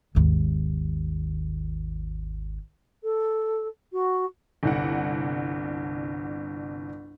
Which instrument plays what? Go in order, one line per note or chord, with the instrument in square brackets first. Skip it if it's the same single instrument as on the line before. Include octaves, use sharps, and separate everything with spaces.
[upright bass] G#1 D#2
[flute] A4
F#4
[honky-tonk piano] G1 C2 F#5